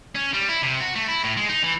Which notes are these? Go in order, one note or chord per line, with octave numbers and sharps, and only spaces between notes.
C#4
G3
E4
C3
F#4
A3
E4
A2
G#3
D#4
E3